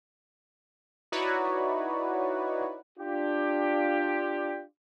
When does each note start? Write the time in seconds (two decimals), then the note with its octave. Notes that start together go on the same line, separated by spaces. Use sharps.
1.12 D#4 E4 F#4 B4 C#5 D5
2.99 D4 F4 G4